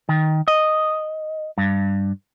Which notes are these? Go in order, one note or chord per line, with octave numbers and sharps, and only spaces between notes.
D#3
D#5
G2